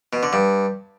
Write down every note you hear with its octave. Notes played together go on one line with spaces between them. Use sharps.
B2
D3
G2